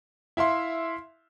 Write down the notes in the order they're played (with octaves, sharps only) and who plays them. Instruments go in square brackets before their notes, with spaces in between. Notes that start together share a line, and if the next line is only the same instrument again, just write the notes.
[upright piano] E4 E5 F5 C6